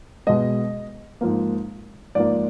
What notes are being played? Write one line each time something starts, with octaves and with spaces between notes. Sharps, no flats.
B2 G#3 D#5
G#2 F3 A#3
G#2 F3 A#3 D5